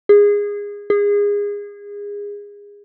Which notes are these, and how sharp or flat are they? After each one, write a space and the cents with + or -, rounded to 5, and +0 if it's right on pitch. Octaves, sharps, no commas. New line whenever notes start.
G#4 -20
G#4 -25